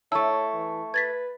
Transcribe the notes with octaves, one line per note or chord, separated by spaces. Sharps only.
A3 E4 C#5 A5 C#6 E6
E3
B4 G#6 A6 B6